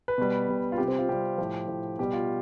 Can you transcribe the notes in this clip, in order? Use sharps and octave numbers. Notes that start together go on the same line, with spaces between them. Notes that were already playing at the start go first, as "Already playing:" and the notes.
B4
B2 G3
B2 G3
F4
C3 G4
G3
C4
F4
C3 G3 G4
A2 F3
A2 F3
B2 G3 G4
F4